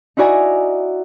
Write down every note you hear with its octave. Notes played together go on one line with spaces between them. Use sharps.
D#4 E4 F#4 D5 G#5 A#5